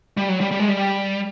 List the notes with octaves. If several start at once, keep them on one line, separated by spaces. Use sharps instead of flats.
G3
F#3
G3
G3
G#3
G3